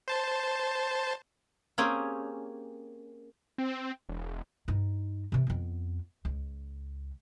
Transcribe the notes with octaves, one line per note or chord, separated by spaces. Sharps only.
C5 A5
A#3 C4 C#4 G4 G#4
C4
E1
G2 D#4
C3 E3
F2 B3
C#2